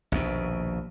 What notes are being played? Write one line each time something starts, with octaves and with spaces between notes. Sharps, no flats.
A#1 D#2 B2